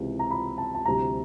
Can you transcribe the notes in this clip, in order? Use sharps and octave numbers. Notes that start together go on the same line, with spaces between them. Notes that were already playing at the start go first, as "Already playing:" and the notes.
Already playing: C#2 C3 E3
A#5
B5
A5
A5
D2 C3 E3 G3 A#5